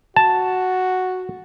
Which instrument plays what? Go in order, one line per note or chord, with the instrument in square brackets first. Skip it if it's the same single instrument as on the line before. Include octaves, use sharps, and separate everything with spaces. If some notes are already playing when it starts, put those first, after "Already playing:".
[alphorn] F#4 [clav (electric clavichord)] A5